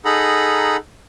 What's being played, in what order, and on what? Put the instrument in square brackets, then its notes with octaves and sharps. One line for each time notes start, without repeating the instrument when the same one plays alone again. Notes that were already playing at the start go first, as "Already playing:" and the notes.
[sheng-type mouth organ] D#4 G#4 A4 F#5 A#5 B5